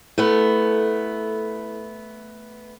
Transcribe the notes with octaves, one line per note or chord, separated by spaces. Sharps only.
A3 B3 E4 A4